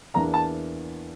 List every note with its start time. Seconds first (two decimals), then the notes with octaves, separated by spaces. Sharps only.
0.14 E2 E3 A#3 D4 A#5
0.34 A5